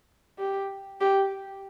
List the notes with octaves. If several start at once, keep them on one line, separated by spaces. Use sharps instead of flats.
G4
G4